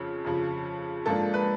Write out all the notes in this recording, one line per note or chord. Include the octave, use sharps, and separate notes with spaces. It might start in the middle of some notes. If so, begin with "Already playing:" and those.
Already playing: F2 C#3 F3
F2 C#3 F3
G#2 F3 A#3 D4 A4
B4